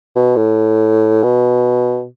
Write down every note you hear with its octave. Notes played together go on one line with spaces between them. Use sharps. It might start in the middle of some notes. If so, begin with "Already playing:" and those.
B2
A2
B2